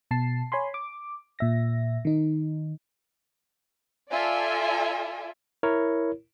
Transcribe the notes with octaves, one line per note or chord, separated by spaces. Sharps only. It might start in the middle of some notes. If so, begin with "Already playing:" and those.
B2 A5 C7
C#5 G#5 B5 C6
D6
A#2 E5 A#6
D#3 D#4
F4 A4 D5 E5 G#5
E4 A#4 C#5